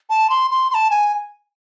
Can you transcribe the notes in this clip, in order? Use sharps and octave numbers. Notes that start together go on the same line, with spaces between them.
A5
C6
C6
C6
A5
G#5